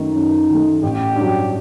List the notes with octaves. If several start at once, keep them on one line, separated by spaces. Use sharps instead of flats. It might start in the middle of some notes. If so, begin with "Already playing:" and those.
Already playing: F#2 D#3 A3 D#4
F#2
D#3 A3
A1 G4
G2 F#3